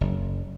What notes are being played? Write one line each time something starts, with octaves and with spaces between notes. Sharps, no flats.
F#1